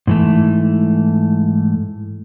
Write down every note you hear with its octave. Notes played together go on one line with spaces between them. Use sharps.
G#2 E3 A3